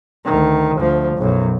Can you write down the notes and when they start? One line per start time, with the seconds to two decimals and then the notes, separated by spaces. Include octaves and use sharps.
0.25 D2 D#3
0.77 D2 F3
1.18 B1 F#2